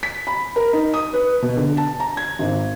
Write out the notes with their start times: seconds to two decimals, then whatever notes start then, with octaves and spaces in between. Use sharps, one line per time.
0.03 B6
0.27 B5
0.56 A#4
0.73 D#4
0.94 D#6
1.13 B4
1.42 B2
1.57 D3
1.77 A5
2.00 A#5
2.17 G#6
2.39 G#1